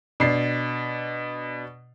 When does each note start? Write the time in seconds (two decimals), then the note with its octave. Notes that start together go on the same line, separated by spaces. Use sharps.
0.20 B2 D4 C7